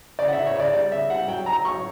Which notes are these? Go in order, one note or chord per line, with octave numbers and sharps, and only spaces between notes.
C#3 D5
F#5
E5
C#3
C#5
C#3 D5
G3 D5
C#3 E5
G3 F#5
F#3 G5
F#3 A#5
F#3 C#6